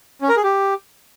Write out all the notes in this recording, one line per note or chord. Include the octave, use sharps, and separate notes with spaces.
C#4
A#4
G#4
G4